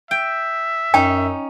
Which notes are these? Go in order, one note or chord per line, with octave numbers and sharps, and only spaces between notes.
E5 G5
F#2 C#4 D#4 G5